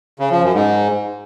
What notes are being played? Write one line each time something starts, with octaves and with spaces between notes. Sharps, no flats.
C#3
F3
F#2
G#2